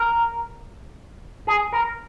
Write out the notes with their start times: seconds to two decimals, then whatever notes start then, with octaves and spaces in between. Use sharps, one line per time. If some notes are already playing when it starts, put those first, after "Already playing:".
Already playing: A#4
1.47 G#4
1.73 A#4